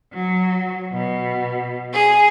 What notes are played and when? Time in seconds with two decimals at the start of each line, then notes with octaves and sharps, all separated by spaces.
0.14 F#3
0.92 B2
1.92 G#4